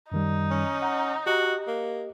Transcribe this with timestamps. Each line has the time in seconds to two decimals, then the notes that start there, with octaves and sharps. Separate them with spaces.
0.12 F#2 D#3 G3 D#4
0.51 C#4
0.82 F#5 A#5
1.27 F#4 G4 D#5
1.67 A#3